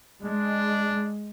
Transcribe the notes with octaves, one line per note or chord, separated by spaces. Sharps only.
G#3 D4